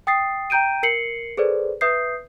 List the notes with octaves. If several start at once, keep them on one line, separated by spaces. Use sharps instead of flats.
G5 D#6 A6 C7
G5 A#5 G6 D7 D#7
A#4 C7 C#7 F#7
G#4 A4 B4 C5 D5
B4 E5 D#6 G6 C7